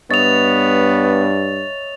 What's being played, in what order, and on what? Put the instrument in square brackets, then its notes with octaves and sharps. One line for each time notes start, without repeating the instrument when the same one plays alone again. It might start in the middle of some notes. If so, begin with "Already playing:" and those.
[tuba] G2 [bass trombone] B3 [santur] C#5 D#5 E5 [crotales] A6 F7